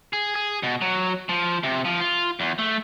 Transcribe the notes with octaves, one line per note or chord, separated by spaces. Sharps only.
G#4
G#4
B2
F#3
F3
C3
F3
F4
E2
A3